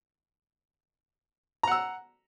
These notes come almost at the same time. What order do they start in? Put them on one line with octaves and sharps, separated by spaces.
A#5 F#5 E6